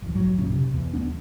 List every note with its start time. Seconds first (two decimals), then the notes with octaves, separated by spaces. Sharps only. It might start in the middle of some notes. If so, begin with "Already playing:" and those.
0.02 F#1 E2
0.15 F1 B1 G#2 F#3
0.38 B1 F#2 A#2 C#3
0.52 C3
0.74 E2
0.93 D#1 F#2 B3 D4